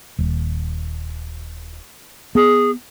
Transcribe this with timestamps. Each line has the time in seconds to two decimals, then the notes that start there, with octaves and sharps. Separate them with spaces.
0.18 D#1
2.35 B3 G#4